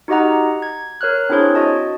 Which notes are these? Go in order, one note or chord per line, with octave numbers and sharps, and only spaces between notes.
D#4 F#4 G4 D#5 F#5 A#5
G#6
A#4 C#5 F6 F#6
C4 D4 E4 G#4 C5 C#5
F#4 D#5 A5